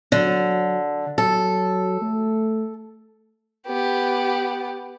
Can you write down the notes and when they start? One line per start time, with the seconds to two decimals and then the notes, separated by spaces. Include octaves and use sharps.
0.12 D3 F#3
1.18 F#3 A4
2.02 A3
3.67 B3 G4